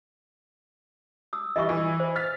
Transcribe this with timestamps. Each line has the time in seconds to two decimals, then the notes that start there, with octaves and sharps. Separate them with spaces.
1.33 D#6 E6
1.56 E3 G3 B4 D#5 E5 C#6
1.69 E3 E6
2.00 C5
2.16 F6 A6 B6